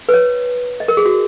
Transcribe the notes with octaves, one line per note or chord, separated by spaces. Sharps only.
B4
C#5
D#5
A#4
G#4
F#4